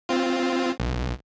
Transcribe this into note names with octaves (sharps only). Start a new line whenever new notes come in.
C4 F4
B1